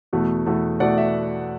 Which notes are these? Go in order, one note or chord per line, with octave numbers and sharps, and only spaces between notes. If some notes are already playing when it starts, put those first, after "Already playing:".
E2 B2 A3
E2 B2 A3
E2 B2 A3 D5 F#5
E5